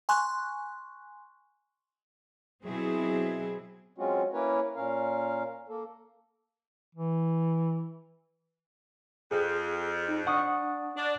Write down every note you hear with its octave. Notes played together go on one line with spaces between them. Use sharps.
G#5 C6 C#6 F#6
B2 F#3 C4 E4 G#4
F#3 G#3 C4 C#4 F4 F#4
A#3 C#4 E4 A#4 B4 C#5
A#2 C#4 A#4 F5
A#3 A4
E3
F2 G#4
D#4
D4 F#5 C#6 D#6
D4 D5